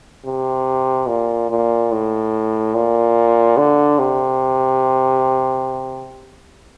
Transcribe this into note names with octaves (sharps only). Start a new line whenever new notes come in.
C3
A#2
A#2
A2
A#2
D3
C3